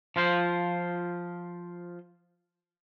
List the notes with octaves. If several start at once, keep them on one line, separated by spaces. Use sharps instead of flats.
F3 F4 C5